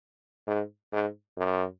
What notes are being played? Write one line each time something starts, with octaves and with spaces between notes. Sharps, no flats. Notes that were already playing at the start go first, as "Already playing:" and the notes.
G#2
G#2
F#2